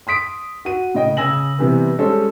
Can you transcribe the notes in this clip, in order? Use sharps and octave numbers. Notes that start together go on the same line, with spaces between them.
C6 D#6 B6 D7
F#4 D#7
A2 C#3 D#5 G5
C#3 G#5 E6 A#6 F#7
C3 E3 G3 B3 C4
G3 G#3 C#4 A4 C5